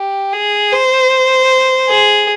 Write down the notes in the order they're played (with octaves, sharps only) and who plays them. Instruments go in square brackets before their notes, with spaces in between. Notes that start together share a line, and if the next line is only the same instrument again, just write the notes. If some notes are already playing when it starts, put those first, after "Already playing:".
Already playing: [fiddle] G4
G#4
C5
G#4